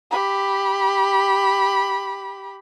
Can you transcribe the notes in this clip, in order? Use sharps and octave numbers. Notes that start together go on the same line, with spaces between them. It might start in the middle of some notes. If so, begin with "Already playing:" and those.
G4 B5